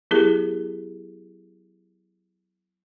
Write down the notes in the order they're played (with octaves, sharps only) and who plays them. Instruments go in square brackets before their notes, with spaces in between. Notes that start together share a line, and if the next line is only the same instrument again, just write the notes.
[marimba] F#3 B3 E4 G4 G#4 A#4